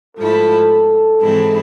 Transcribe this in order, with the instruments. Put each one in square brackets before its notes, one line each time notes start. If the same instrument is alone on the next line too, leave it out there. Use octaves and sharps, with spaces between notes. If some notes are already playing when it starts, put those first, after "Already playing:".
[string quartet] G#2 F3 A3 E4 [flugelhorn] A4
[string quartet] G#2 E3 G#3 C4 E4